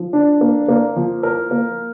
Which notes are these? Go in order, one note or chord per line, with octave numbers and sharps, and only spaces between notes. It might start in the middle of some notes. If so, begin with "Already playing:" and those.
Already playing: F3
D4
A#3
A#3
F3
A#4
A#3